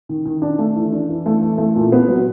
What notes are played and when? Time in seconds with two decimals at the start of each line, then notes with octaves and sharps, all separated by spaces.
0.09 D#3
0.25 D#3
0.42 D4
0.59 A3
0.76 E3
0.92 D4
1.09 E3
1.26 A3
1.41 E3
1.58 A3
1.76 A#2
1.92 B3
2.08 F#3